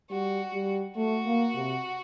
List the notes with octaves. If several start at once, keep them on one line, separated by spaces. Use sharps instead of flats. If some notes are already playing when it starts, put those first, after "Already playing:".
G3 F#4
G3
A3 F#4
A#3
C3